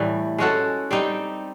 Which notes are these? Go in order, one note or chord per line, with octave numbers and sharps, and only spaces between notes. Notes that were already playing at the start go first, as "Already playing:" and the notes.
Already playing: A2 E3 G3 A3
G#3 C#4 F#4 A4
G3 C4 D#4 G4